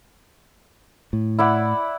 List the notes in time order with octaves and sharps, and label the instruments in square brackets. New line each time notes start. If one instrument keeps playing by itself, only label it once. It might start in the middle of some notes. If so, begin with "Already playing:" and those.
[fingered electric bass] A2
[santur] E4 D5 F#5